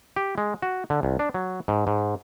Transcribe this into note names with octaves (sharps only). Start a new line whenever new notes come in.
G4
G#3
F#4
D3
C2
D4
F#3
G#2
G#2